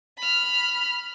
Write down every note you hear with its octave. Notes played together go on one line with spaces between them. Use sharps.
B5 F6